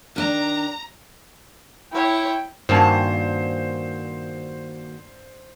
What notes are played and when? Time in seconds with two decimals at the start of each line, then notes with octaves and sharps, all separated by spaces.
0.16 D#3 D4 A#5
1.92 E4 C#5 G5
2.69 G2 A#2 D#3 A#3 C#4 F#4 C5 A5